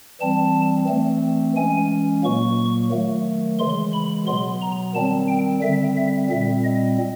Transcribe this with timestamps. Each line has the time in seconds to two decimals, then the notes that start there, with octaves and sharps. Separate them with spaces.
0.21 E3 G3 C4 A5
0.88 E3 A3 C4
1.56 E3 G#3 C#4 G#5
2.24 A#2 F#3 A#3 C#6
2.92 D#3 F#3 A3
3.59 C#3 E3 G#3 C6
3.93 B5
4.27 B2 F#3 B3 C6
4.62 A#5
4.95 D#3 G3 C4 A5
5.28 G5
5.62 D3 G3 C4 E5
5.97 E5
6.30 A#2 G3 C4 E5
6.64 D#5